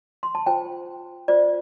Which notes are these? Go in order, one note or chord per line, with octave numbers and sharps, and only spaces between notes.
C6
A5
F4 C5 G5
F4 C5 D5